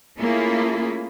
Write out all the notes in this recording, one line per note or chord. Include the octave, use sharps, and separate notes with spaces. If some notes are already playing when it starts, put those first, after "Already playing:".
A3 A#3 C#4 E4 F4 G#4